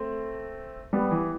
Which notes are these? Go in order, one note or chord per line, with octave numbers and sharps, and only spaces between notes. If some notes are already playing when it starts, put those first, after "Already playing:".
Already playing: A3 C4
G3 B3
E3